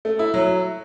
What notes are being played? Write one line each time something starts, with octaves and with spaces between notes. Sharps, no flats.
A3
E4
F#3